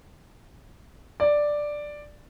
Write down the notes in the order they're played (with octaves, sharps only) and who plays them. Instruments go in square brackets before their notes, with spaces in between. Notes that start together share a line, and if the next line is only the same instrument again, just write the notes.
[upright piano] D5